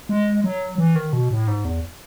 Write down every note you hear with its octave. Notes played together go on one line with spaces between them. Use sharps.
G#3
F#3
E3
D#3
B2
A2
G#2
E2